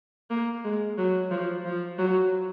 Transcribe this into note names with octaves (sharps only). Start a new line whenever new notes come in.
A#3
G#3
F#3
F3
F3
F#3